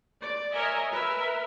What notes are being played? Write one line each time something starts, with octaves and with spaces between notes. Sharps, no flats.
D5
A#4 C#5 D#5 E5 G#5
A#4 B4 E5